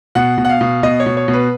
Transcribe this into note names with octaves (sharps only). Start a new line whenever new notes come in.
B2 F#5
B2
F#5
F5
B2
B2 D#5
C#5
B2
C#5
B2
B4